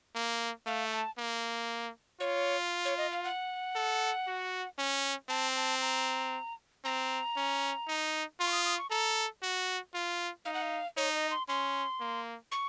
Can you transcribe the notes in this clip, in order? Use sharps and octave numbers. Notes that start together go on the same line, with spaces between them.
A#3
A3 F5
A5
A#3
F4 C#5
C#5
D#5
F5
F#5
A4
F#4
C#4
C4 A5
A5
A#5
C4 A#5
C#4
D#4
F4 C6
C#6
D#6
D#6
C#6
A4 A#5
F#4
F4
D#4 F5
F#5
F5
D#4 C#5
D#5
C6
C#4 C6
A#3
C#6